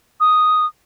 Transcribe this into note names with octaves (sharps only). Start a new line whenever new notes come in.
D#6